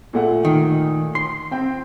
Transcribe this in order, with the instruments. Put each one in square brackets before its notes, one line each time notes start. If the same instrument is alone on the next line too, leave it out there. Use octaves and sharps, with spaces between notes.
[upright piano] A#2 A3 F#5
[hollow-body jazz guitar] D#3
C6
[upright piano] C4 G5